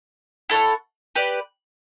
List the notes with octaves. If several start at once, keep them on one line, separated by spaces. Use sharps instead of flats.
E4 A4 C#5 F#5
G4 B4 D5